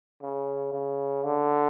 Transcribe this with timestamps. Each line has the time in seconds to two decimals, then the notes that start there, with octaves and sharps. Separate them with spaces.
0.22 C#3
0.73 C#3
1.24 D3